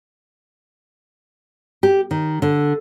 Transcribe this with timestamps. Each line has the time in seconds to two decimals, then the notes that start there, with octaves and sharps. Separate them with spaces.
1.83 G4
2.11 D#3
2.42 D3